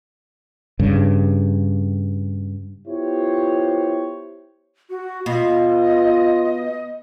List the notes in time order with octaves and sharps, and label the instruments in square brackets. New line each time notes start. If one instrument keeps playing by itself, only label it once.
[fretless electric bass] G2 C#3
[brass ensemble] B3 E4 F4 G4 C5 C#5
[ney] F#4
[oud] B2 [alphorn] F4 [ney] D#5